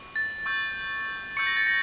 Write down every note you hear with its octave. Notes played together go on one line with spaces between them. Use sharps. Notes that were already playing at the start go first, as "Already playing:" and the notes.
Already playing: C#6 E6
A6
C#6 E6 G6
C#6 E6 G6 C#7
A#6
A6
A#6